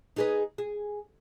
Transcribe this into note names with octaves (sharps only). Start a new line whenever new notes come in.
D#4 G#4 B4
G#4